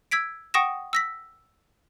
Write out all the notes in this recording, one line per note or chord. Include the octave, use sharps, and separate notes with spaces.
E6 G#6 B6 D7
F#5 G5 C#6 D#6 A#6 E7
E6 A#6 B6